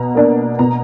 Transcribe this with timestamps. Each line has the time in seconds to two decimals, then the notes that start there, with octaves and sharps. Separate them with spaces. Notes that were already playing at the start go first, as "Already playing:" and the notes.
Already playing: B2 A#5
0.15 A#3 D4
0.59 B2 A#5